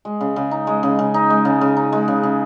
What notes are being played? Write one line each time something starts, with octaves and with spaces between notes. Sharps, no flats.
G#3
C#3
C#3
D#4
G#3
C#3
C#3
D#4
G#3
C#3
C#3
D#4
G#3
C#3
C#3